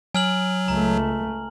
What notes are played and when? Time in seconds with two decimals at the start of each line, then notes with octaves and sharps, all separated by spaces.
0.15 F#3 G#5 F6 F#7
0.68 C#2 A3 A#5